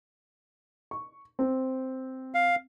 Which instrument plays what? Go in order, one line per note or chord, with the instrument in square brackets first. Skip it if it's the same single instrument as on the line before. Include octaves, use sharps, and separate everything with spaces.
[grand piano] C#6
C4
[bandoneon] F5